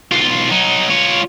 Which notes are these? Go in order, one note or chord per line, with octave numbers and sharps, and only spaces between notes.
B1 F4
F#3 D#4
F4 C#5